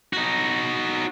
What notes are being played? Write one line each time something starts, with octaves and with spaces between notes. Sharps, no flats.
D#4 F#4